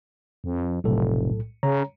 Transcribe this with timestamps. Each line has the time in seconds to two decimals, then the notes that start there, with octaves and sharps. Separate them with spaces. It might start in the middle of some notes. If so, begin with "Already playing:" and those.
0.44 F2
0.84 F1 B1 A2 A4
1.63 C#3 C#5 A#5